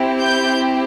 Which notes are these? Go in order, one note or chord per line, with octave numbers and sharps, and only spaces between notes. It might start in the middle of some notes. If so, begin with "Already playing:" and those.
Already playing: C4 E4 G4
G6